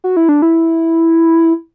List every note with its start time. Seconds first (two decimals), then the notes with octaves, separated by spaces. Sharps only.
0.04 F#4
0.17 E4
0.29 D4
0.42 E4